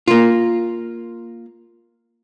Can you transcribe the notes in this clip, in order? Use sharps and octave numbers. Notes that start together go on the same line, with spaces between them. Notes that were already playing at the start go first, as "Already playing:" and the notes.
A#3 F4